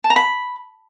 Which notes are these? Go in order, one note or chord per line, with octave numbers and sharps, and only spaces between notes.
A5
A#5
B5